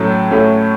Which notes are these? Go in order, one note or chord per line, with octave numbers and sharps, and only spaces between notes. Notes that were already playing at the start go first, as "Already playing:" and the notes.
Already playing: A2 F#3 A3 C#4
A2 F#3 A3 C#4